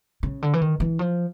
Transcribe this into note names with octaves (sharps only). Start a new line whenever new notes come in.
C#3
D3
E3
D#3
E3
F3